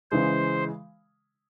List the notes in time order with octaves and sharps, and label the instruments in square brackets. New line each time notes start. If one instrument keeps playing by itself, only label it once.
[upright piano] C#3 E3 G#3 [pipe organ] C5